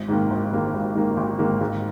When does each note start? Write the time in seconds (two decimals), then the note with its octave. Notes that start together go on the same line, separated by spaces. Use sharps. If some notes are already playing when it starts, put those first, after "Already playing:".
Already playing: G#1
0.08 G#2 D#3 A#3
0.30 G#1
0.52 G#2 D#3 A#3
0.74 G#1
0.95 G#2 D#3 A#3
1.17 G#1
1.39 G#2 D#3 A#3
1.60 G#2